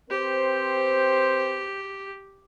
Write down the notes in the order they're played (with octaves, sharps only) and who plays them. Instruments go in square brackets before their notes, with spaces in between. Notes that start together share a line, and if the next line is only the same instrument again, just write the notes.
[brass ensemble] C4 B4 C5 [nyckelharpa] G4